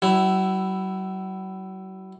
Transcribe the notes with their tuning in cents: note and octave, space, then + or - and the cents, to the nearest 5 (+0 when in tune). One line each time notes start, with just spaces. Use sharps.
F#3 +40 E4 +0